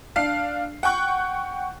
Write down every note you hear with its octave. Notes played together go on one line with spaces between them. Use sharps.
D4 F5 C7
F#5 G5 C#6 F#6